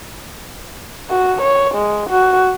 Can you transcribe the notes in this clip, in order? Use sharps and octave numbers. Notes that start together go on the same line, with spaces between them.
F#4
C#5
G#3
F#4